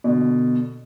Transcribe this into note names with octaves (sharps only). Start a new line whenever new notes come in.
B2 D3